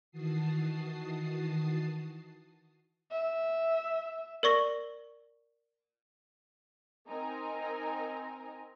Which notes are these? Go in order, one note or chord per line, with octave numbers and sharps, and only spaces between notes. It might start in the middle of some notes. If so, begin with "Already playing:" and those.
D#3 E3 F#4 A5 D#6 C7
E5
A#4 D5 C#6 A#6
C4 D#4 A#4 G#5 A#5